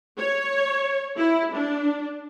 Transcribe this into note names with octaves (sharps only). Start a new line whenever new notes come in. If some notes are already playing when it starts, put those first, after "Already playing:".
C#5
E4
D4